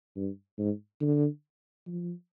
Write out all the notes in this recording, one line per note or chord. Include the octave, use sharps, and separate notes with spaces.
G2
G#2
D3
F3